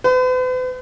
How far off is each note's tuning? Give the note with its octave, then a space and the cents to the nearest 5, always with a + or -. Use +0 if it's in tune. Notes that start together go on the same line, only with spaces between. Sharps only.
B4 +45